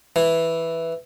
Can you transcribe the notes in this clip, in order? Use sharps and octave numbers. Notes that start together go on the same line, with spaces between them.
E3